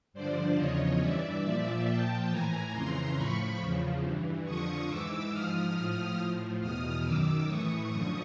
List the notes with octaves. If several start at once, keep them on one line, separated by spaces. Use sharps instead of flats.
G2 D3 F3 C5 D5
E2 C#3 F3 C#5 D#5
G2 E3 D5 E5
A#2 F3 D5 E5
A#2 F3 G5 A5
A2 E3 G#5 A#5
F2 C#3 E3 A#5 C6
A2 F3 B5 C#6
E2 C#3 F3
G2 E3
F2 D3 F3 C#6 D#6
G#2 E3 D6 E6
G#2 F3 D#6 F6
A2 F3
A2 F3
E2 B2 D#6 F6
F#2 D#3 D6 E6
A2 E3 C#6 D#6
F#2 D3 F3 C#6 D#6